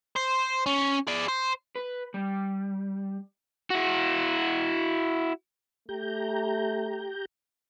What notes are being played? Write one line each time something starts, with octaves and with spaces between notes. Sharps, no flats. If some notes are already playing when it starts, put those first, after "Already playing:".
C5
C#4
G#4 D5
C5
B4
G3
E4 F#4
A3 G4 A#5 G6